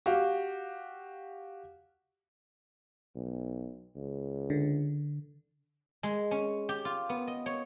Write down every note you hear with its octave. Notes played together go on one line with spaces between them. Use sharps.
F#4 G4 F5
B1
C#2
D3
G#3
C#4
G4
F4
B3
D#5
C#5